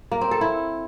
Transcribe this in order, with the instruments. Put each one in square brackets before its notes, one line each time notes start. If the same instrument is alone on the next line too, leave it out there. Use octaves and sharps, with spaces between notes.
[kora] A#3
C4
A4
E4